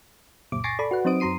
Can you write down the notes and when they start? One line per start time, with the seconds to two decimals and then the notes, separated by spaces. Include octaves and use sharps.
0.52 C#2 F#2 A#2 D6
0.64 G#5 C#6 A6 A#6 C7 D7
0.79 A4 D5 B5
0.91 F#4 B4 F#5
1.05 F#3 C4 D#4 C5 D#6 D7
1.20 F#2 F#3 A#5 C6 C7 D#7